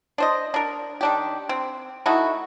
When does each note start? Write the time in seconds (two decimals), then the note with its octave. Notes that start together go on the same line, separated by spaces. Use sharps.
0.18 D4 C5 D#5
0.54 D4 A#4
1.01 D#3 D4 G4
1.49 C4
2.06 A3 D#4 E4 F#4